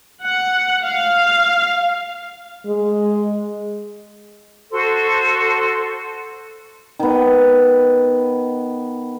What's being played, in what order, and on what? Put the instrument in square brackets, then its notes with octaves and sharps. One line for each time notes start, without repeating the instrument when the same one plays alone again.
[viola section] F#5
F5
[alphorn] G#3
[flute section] F#4 A4 C5 C6
[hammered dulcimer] D#3 B3